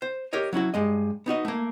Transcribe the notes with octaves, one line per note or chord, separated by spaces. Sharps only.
C5
G4 A#4 C#5 D#5
F#3 C#4 E4 F#4
G2 G#3 D#5
B3 D#4 F#4 D#5
A3 A#3